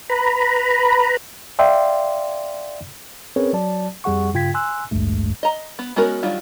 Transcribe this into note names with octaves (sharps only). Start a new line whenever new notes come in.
B4 A#5 B5
D5 E5 F5 G5 C6
C4 C#4 G#4 A#4 B4 C#5
F#3 D5 A5
F2 G3 G#4 F#5 C#6
G2 C#3 F4 G5 G#6 B6
G#5 C6 E6 F#6
A1 D2 G2 G#3 A3
D#5 A#5
B3
G#3 B3 C#4 F#4 A#4
D#3 F#3 G3 D4 F4